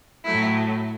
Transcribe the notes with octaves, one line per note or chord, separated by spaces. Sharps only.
A2 F#3 A3 E4